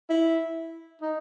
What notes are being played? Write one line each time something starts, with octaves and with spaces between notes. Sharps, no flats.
E4
D#4